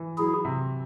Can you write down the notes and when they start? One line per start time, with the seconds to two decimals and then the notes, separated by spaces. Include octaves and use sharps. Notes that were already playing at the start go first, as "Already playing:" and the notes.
Already playing: E3
0.18 F#3 E4 G#4
0.45 C3